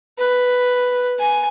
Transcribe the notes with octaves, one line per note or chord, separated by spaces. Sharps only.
B4
G#5